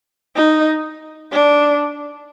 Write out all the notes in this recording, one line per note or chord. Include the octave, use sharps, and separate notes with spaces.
D#4
D4